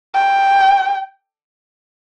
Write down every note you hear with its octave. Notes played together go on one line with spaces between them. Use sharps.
G5